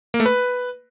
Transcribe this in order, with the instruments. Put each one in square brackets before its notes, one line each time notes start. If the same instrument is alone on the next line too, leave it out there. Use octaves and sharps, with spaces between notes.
[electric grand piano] A#3
A3
B4